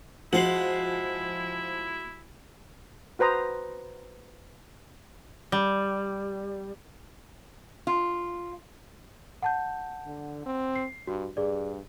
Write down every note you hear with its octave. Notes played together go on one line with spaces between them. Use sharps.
F3 G#3 E4 F#4 F#5 C7 F#7
F#4 B4 C5 A#5 D#6
G3
F4
F#5 A5 G6
D3
C4
C7
G2 F#4
G2 G#4 D5